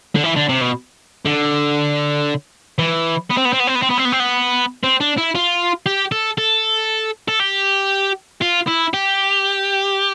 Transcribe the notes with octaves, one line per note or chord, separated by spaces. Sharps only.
D3
E3
D3
C3
B2
D3
E3
B3
C4
B3
C4
B3
C4
B3
C4
B3
C4
B3
C4
B3
C4
D4
E4
F4
G4
A4
A4
A4
G4
F4
E4
G4